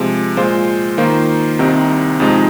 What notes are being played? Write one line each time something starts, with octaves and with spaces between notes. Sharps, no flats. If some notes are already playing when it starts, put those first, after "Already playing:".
Already playing: C3 F3 G#3
A#2 G#3 F4 C5
D#3 A#3 F4 C5
C2 C3 D#3 C4 D#4
F2 C3 F3 G#3 D#4